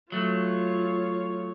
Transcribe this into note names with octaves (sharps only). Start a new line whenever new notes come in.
F#3 A3 F4 C#5